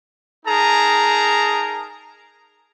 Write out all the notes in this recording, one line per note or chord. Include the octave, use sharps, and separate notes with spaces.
D#4 G#4 A#4 A5 A#5